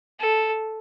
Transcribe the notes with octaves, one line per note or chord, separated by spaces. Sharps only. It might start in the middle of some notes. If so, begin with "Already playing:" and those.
A4